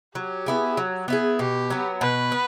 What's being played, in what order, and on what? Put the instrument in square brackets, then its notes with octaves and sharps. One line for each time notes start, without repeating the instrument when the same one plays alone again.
[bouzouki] F#3 [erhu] G4
[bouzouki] B3 E4 G#4
F#3
B3 E4 G#4
[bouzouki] B2 [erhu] G4
[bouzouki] F#3 B3
[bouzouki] B2 [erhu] B4
[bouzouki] B3